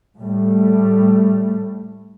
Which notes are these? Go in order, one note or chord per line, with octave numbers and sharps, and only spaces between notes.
A2 G3 A3